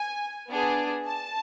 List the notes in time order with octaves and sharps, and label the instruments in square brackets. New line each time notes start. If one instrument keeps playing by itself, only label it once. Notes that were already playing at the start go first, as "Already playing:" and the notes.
Already playing: [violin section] G#5
B3 D4 G#4
A5